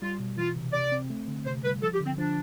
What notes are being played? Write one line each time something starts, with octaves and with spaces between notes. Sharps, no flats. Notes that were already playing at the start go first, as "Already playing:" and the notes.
G3 F4
B2
E3 F4
C3
C3 D5
C4
A3
D3
C3 C5
G3 B4
F3 A4
G4
D3
C4
F3 D4